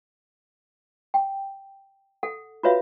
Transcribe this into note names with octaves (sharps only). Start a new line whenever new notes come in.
G5
A4 F#5
F4 F#4 B4 C#5 E5 F5